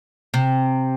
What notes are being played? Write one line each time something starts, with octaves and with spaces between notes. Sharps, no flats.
C3